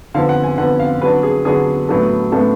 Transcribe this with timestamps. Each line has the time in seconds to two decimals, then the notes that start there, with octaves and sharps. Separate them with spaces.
0.14 D3 F3 B3 F5
0.29 F#5
0.44 G#5
0.58 D3 F3 B3 F#5
0.79 F5
1.02 D3 F#3 B3 D4 B4
1.23 G#4
1.45 D3 F#3 B3 D4 G#4
1.89 A2 F#3 B3 D4 A4
2.32 A2 F#3 B3 D4 A4